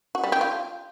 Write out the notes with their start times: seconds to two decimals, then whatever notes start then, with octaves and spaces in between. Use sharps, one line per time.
0.15 F#4
0.24 G3
0.32 G4
0.41 F4